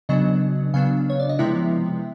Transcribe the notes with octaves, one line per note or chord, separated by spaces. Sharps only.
C#3 F#3 B3 D4 D#5
C#3 F#3 B3 D4 F5
C#5
D5
D#5
C3 F3 G#3 B3 E4 E5